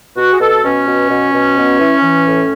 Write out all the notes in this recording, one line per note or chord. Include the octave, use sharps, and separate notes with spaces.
B2 F#4
G#4
B2 A4
B2 C#4
B2
B2
B2
B2
E3
E3
A2